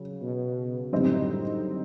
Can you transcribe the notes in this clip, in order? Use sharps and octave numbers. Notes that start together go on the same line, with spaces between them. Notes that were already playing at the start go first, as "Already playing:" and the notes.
Already playing: C#3 F#3
B2
F#2 A2 D3 G3 C4 D#4